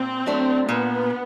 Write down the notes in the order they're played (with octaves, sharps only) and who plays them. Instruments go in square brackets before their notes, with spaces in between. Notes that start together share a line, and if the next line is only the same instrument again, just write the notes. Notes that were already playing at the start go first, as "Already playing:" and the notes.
Already playing: [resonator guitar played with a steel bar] A#2 [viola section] C4
[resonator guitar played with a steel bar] F#3 A3 D4
[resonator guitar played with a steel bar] A#2 [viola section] B3